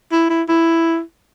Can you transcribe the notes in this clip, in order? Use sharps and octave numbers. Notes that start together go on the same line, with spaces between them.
E4
E4
E4